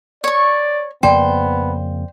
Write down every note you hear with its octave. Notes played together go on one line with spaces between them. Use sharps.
C#5 D5 C#6
F2 C#3 A#3 B3 C5 D5 G5